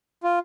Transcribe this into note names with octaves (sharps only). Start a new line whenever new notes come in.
F4